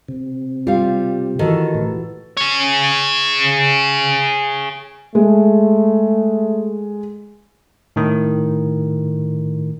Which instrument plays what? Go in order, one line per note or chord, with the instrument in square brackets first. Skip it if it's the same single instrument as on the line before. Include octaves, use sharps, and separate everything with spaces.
[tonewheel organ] C3
[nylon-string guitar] G3 F5 [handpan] F4 G4
[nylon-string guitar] D#3 [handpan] E3 F#4 A4
[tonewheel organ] A2
[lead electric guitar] G#4 C#5
[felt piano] G#3 [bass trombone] A3
[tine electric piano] A2 D#3